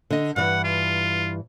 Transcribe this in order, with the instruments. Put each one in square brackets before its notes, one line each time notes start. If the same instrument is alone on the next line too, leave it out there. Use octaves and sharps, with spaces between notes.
[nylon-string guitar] D3 D#5
[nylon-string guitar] G2 E3 [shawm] F#5
[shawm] F4